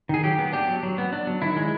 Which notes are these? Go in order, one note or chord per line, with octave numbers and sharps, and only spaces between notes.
D#3 G#4
F#3 G4
B3
D4 G4
F#3
F#3
B3
D4
F#3
D#3 E4
G#3